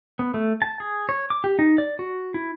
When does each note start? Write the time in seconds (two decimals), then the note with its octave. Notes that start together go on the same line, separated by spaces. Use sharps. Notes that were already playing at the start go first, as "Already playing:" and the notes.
0.19 B3
0.34 A3
0.62 A5
0.80 G#4
1.09 C#5
1.30 D6
1.44 G4
1.59 D#4
1.78 D5
1.99 F#4
2.34 E4